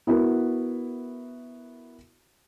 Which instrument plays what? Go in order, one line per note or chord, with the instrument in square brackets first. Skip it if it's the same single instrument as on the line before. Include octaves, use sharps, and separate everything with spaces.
[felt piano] B3 E4 F#4 A#4